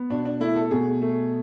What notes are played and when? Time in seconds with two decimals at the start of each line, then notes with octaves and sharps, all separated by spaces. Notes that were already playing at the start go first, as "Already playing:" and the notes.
Already playing: B3
0.10 B2 D4
0.25 D4
0.40 A3 E4
0.56 A4
0.71 B2 G#4
1.02 A3